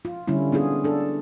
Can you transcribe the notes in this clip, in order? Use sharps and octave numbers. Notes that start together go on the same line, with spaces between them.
F4
D3 G3 C#4 E4
B3 D4 F4 G#4
D4 A4